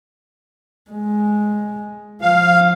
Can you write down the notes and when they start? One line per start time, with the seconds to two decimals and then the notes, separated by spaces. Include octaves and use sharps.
0.91 G#3
2.22 F3 F5